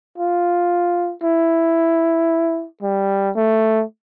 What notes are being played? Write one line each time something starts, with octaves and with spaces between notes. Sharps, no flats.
F4
E4
G3
A3